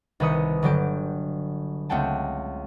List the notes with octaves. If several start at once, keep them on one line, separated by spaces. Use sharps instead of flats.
C2 D#3 B4 D#6 C#7
G1 D3 F#3 G4 D7
C#2 A3 C4 F#5 G5 A5